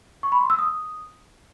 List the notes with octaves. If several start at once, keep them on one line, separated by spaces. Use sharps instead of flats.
C#6
B5
C6
E6
D#6